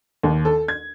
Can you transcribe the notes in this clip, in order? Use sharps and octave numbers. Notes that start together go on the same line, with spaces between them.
D#2
A4
G#6